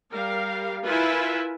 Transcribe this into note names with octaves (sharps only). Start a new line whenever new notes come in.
G3 A#4 F5
E4 F4 A#4 B4 E5 G#5